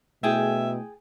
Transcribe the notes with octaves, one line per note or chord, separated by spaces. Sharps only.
B2 A3 E4 G#4 E5 G5 A5